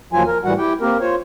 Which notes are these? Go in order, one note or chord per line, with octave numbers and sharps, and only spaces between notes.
D#2 F3 F#3 F4 G#5
A#4
A2 E3 G3 F#4 F#5
E4 G4 G5
A#3 C4 G4 A#4
F4 C5 C#5